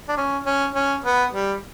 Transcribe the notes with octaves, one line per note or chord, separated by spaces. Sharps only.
D4
C#4
C#4
C#4
B3
G3